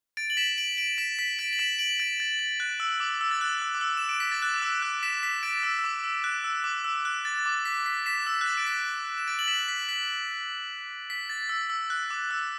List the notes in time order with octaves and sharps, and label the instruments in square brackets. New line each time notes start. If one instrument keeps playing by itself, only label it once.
[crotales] A6 D7
F#7
B6 E7
D7 F#7
D7 F#7
B6 E7
B6
A6 D7
F#7
B6 E7
D7 F#7
A6 D7
A6
A6
F#6
E6
D6
E6
A6
F#6
E6
D6
E6
E7
D7
B6
A6
F#6
D6
E6
F#6
B6 E7
B6
A6 D7
E6
E6
D6
E6
F#6
E6
D6
E6
F#6
A6
D6
B6
B6
B6 E7
E6
F#6
A6
D7
B6
E7
A6 D7
F#7
B6 E7
B6
B6
B6
A6
E6
E6
F#6
D6
E6